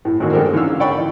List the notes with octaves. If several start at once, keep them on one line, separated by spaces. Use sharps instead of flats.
A2 E4
A1 D#2 G#3 A#3 F#4
D3 G#3 G4 A4 A#4 C5
G#2 D3 E3 C#4 F5 E6
C#5 D5 F#5 G5 B5 C#6
E3 D#4